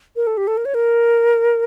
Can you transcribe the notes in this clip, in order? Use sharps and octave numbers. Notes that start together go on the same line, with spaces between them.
A#4
A4
G4
A4
A#4
C#5
A#4